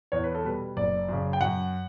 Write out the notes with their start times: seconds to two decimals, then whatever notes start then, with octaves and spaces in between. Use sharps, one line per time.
0.12 E2 C#5
0.24 B4
0.35 A4
0.44 B2 G3 B4
0.76 F#1 D5
1.09 F#2 C#3
1.33 G5
1.41 F#2 F#5